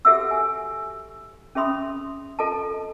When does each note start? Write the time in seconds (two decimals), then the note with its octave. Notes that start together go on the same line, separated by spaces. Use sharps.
0.05 F#4 G4 A4 E5 F#5 E6
0.31 G#5
1.55 C#4 G#4 E5 B5 C6 D#6
2.39 F4 A4 D#5 A5